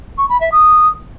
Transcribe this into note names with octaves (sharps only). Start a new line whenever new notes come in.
C#6
B5
E5
D#6